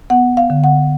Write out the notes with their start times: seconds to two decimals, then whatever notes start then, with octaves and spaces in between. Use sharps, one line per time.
0.10 B3 F#5
0.37 F5
0.50 D3
0.64 F#5